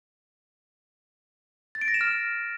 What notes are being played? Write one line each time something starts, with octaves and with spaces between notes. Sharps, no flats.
A6
D7
A#6
E7
F6